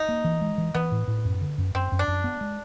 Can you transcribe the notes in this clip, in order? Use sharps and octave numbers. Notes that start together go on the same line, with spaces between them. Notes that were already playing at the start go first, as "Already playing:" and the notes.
Already playing: D#4
A#3
E3
G#3
E3
E3 B3
A2
A2
F#2
D3
F#2
F#2 C4
F#2
D4
F#2
B3
G#3